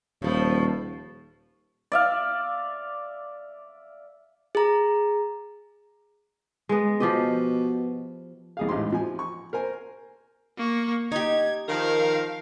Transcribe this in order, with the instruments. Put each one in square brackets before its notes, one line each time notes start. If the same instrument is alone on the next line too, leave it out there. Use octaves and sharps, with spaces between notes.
[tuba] D#1 [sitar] A2 F3
[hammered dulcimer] D5 E5 F5
[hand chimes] G#4 A#5
[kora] G#3 B3
[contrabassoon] B2 [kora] F3 G4 D#5
[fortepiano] C2 G#4 F5
A1 G#2 G4 C6
F3 G#5
C#6
A#4 C5 G#5
[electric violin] A#3 C#6
[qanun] D#4 G4 [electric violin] G#6
[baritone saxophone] D#3 [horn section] F3 A#4 [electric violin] F5